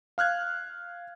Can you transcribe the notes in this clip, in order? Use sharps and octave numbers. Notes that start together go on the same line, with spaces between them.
F5 F6 F#6 G#6